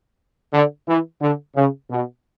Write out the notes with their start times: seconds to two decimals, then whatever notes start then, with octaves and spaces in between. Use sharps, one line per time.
0.53 D3
0.87 E3
1.21 D3
1.56 C#3
1.90 B2